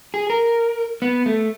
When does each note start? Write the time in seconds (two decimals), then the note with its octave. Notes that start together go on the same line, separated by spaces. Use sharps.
0.14 G#4
0.30 A#4
1.02 B3
1.26 A3